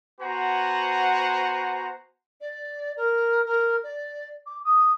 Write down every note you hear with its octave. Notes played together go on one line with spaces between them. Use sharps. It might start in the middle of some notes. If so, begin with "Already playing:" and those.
B3 F#4 C5 F#5 G#5 A#5
D5
A#4
A#4
D5
D6
D#6